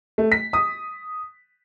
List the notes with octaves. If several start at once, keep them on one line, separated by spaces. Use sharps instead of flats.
A3
B6
D#6